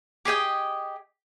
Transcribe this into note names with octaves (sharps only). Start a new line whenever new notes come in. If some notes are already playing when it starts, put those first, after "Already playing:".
G4 G#4 D#5 G5